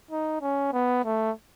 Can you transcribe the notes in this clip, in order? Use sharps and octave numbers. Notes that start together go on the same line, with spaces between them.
D#4
C#4
B3
A3